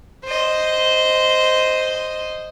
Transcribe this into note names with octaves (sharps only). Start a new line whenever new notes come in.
C5 D#5